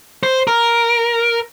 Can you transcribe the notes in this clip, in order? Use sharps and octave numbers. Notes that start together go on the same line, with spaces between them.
C5
A#4